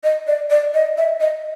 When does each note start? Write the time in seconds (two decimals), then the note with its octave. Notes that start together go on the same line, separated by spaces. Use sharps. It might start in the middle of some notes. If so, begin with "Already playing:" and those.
0.04 D#5
0.27 D5
0.50 D5
0.74 D#5
0.97 E5
1.20 D#5